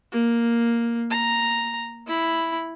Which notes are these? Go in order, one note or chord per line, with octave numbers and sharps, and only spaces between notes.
A#3
A#5
E4 B5